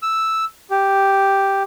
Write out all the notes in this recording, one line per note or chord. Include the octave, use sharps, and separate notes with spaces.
E6
G4